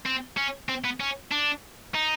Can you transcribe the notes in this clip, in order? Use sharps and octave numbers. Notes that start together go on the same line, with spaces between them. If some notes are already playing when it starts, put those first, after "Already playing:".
C4
C#4
C4
B3
C#4
D4
D#4